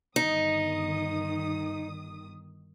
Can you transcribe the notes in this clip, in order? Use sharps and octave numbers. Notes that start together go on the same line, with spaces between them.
G1 D#3 D#4 D#6